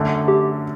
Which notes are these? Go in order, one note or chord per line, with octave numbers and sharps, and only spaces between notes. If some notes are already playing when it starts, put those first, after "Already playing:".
Already playing: F#2 D3 A3
G4